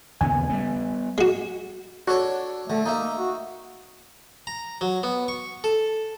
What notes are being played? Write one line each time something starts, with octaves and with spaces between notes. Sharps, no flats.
D#2 C#3 B3 G#5
G3 G#3 B3
G#3 F#4
D4 F#4 A4 C#5
D3 A3
A#3 D#4 E5
F#4
A#5
F#3
B3
C#6
A4